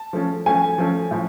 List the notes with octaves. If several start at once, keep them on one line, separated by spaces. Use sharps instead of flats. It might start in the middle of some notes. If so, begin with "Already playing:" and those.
Already playing: A5
F3 A3 C#4
F3 A3 C#4 G#5
F3 A3 C#4
A2 F3